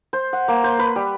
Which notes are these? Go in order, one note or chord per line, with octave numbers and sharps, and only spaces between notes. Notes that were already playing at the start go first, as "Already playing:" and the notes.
C5
F#5
A#3
C5
B4
G3